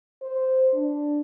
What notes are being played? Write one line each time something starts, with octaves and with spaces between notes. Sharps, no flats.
C5
D4